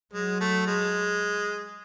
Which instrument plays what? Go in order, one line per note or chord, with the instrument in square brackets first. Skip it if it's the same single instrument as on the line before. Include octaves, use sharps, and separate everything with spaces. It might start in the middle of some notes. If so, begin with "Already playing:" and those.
[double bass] F#3 [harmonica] G#3
[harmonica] A3
G#3